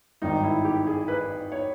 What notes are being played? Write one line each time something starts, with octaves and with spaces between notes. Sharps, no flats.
G#1 G2 D#3 D#4
E4
G4
G#4
B4
C#5